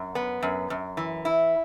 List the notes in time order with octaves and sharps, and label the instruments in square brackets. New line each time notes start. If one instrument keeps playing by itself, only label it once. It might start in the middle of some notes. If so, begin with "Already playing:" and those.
Already playing: [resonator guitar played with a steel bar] F#2
B3
F#2
F#2
E3
E4